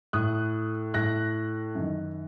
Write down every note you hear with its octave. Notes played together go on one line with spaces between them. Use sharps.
A2 D#6 F#6
A2 F#6 A#6
F#2 D#3